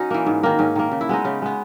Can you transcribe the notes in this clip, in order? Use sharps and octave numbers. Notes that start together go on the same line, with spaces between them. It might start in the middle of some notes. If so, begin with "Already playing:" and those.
Already playing: C#4 D#4 F#4
E3 A#3
G#2
D#3 A#3
G#2 C#4
D#3 A#3
C#3
E4
G#3 B3 D#4
C#3 C#4
G#3 B3